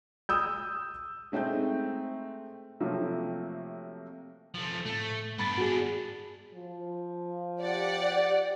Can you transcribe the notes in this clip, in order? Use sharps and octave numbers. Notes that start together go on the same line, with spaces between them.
D#6 E6 G6
G#3 A3 C4 D#4 G6
C3 F3 F#3 A3 A#3
F3 A3
A2 A3
G2 B3 D4 B5 A6
F#4 G#4
F3
G4 D5 F#5